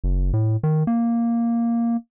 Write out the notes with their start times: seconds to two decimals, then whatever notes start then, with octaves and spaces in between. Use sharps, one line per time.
0.04 F#1
0.33 A2
0.63 D#3
0.87 A#3